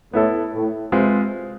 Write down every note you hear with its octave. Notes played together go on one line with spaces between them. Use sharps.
A2 B3 E4 A4
A2
C3 G#3 C4 F4 B4